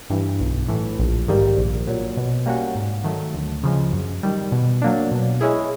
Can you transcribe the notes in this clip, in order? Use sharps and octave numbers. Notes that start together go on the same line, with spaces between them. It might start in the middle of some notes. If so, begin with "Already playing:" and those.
G2 E3
B1
A2 E3
A#1
G#2 D#3 G3 A#3
A#1
A#2 F#3
B2
G3 A#3 C#4 F#4
G#2
D#3 F#3 A3
D2
C#3 F3 G#3
F#2
D#3 G3
B2
F#3 A#3 D4
B2
G#3 C#4 E4 G#4